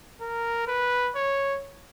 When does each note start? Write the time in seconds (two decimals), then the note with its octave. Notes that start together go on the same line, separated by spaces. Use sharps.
0.21 A#4
0.68 B4
1.16 C#5